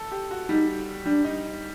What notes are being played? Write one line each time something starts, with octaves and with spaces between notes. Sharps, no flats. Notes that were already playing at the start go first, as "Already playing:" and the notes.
Already playing: A4
G4
F#4
G3 D#4
G3 D4
D#4